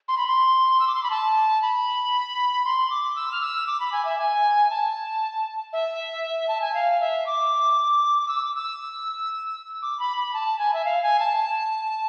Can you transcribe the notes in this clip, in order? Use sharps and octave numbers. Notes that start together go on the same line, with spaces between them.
C6
B5
C6
E6
D6
C6
B5
A5
B5
C6
D6
E6
F6
E6
D6
B5
G#5
E5
G#5
A5
E5
A5
G#5
F5
E5
D6
D6
E6
D6
E6
D6
B5
B5
A5
G#5
E5
F5
G#5
A5
A5